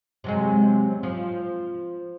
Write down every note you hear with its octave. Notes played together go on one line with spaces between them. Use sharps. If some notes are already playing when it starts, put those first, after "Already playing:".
C3 F#3 G#3
F3